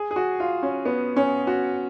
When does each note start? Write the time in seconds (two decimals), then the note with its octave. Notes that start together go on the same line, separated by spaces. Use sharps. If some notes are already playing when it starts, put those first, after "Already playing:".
Already playing: G#4
0.11 G#4
0.16 F#4
0.40 F4
0.63 C#4
0.85 B3
1.16 C#4
1.47 F#4